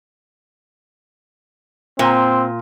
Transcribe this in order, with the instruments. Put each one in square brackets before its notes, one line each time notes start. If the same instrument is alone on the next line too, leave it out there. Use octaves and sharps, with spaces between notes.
[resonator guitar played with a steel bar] A#2 [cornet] C4